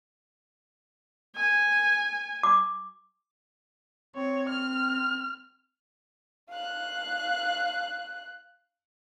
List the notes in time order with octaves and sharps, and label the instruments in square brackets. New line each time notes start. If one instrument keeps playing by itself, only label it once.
[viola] G#5
[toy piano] D6
[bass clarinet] C4 [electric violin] C#5
[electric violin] F6
[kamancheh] F5 F#6